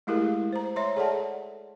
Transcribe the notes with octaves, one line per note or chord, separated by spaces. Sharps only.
G#3 A3 E4 G4 G#4 A#4
C5 A#5
C#5 E5 A#5 C6
G#4 A4 C#5 D5 F#5 A5